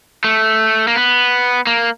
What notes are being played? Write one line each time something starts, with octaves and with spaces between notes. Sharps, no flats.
A3
A#3
B3
A#3